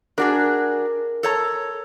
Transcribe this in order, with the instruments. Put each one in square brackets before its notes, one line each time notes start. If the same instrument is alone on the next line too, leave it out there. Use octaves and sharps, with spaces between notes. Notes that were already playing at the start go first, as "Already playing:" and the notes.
[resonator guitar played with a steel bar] D4 F#4 G#4 [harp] A#4
[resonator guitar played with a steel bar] A4 C#5 A#5